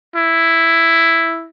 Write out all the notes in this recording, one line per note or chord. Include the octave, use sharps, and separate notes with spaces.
E4